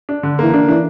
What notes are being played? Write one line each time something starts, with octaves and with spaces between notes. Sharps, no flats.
D4
D3
E3 A#3
D3 D4
E3 D4